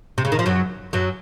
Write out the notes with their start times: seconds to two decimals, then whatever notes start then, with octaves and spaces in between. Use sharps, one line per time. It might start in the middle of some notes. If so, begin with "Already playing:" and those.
0.18 C3
0.25 C#3
0.32 D#3
0.39 F3
0.46 F#2 F#3
0.93 F#2 F#3